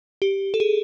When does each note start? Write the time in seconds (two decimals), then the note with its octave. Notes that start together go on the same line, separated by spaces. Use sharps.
0.22 G4
0.54 A4
0.60 G#4